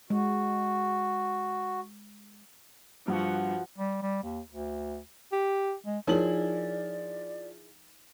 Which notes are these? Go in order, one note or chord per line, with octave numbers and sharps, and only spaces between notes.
G#3 F#4
G2 F3 F#4 F#5
G3
G3
D#2
D2
G4
G#3
F3 D#4 E4 G#4 A#4 C#5 D5 F#7